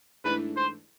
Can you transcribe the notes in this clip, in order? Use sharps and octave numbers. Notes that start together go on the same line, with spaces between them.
G#2 E3 A3 D4 B4
C5